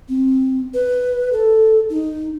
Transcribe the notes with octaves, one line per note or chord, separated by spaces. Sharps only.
C4
B4
A4
D#4